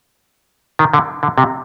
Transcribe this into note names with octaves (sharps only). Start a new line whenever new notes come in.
D#3
D3
D3
C3